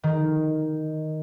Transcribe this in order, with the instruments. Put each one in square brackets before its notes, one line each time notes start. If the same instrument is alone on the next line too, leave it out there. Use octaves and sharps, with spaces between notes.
[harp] D#3